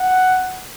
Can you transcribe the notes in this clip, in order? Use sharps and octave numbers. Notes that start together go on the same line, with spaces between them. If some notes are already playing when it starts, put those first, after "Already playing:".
Already playing: F#5